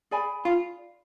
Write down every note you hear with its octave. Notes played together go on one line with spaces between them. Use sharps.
G#4 D5 G#5 B5
F4